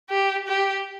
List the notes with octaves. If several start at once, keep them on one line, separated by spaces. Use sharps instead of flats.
G4
G4